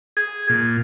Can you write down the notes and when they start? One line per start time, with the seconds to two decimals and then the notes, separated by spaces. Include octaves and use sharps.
0.17 G#4
0.49 A#2